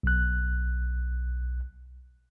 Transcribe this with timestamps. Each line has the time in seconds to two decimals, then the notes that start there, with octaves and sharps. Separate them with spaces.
0.03 B1 F#6